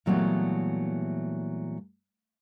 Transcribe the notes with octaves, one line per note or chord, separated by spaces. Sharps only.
A#2 E3 F#3 G3 A3 B3